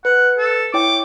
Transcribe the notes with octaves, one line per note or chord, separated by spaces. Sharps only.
B4 F#5
A4
E4 C#5 G5 D6